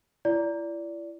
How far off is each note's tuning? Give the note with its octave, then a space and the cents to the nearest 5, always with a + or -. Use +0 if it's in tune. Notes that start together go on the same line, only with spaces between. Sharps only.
E4 +35 D5 -20